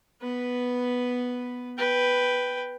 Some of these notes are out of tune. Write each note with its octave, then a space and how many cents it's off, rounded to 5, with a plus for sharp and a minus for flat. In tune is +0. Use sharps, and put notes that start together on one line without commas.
B3 +0 B4 +0
B4 +0 G5 +0